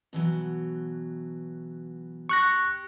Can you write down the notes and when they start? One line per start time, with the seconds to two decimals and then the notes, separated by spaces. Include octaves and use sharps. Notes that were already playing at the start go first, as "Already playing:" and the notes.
0.13 B2 E3 F#3
2.29 G4 C#6 F#6 A#6